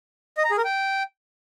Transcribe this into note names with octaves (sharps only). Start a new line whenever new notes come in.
D#5
A#5
G#4
A#4
G5